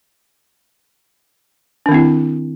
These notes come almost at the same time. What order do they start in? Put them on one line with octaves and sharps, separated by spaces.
D4 D#3 C4 E4